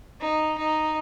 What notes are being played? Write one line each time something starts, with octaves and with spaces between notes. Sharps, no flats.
D#4
D#4